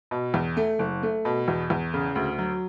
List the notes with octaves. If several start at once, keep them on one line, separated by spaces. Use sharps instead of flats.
B2
E2
A3
F#1
A3
B2
E2
E2
C#3
D2
F#3